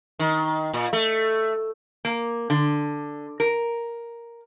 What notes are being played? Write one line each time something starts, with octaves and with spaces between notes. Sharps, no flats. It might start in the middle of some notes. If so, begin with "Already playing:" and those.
D#3
A#2
A3
A#3
D3
A#4